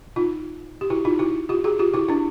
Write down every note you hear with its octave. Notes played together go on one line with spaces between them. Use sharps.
D#4 F4
G4
E4 F#4
D#4 F4
E4 F#4
F4 G4
F#4 G#4
F4 G4
E4 F#4
D4 E4